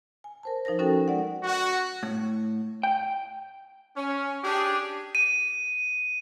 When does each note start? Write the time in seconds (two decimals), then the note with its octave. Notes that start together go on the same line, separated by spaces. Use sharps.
0.24 G#5
0.43 A#4 C5 A5
0.65 F3 D#4 A#4 C5 A#6
0.79 C#4 D#4 F#4 A4 A#4 G5
1.08 G#3 D5 F#5
1.43 F#4
2.03 A2
2.83 G5
3.97 C#4
4.44 D4 G4 G#4
5.15 D#7